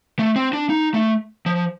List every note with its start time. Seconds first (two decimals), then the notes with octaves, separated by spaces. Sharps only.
0.19 A3
0.36 C4
0.53 D4
0.70 D#4
0.94 A3
1.46 F3